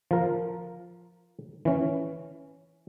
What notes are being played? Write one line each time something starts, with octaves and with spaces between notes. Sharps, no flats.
F3 A#4
E3 C#4